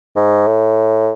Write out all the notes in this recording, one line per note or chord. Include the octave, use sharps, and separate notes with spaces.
G#2
A2